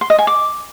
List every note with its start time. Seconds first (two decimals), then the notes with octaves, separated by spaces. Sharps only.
0.01 C6
0.10 D#5
0.19 G#5
0.27 D6